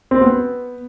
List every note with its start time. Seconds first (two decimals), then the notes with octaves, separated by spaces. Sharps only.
0.11 C4
0.21 B3